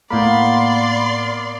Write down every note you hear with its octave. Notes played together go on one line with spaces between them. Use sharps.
A2 A#3 B3 D5 B5 C6